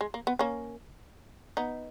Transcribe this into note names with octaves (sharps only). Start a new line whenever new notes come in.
G#3
A#3
B3
A#3 C#4
B3 D#4